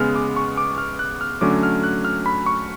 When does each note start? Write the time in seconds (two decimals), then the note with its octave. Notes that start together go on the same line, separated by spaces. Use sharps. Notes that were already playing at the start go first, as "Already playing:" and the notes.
Already playing: C#3 G#3 B3 F6
0.15 D6
0.36 C#6
0.57 D6
0.78 F6
0.99 F#6
1.21 F6
1.41 D3 F#3 A3 C#4 D6
1.63 F6
1.84 F#6
2.05 F6
2.26 B5
2.46 C#6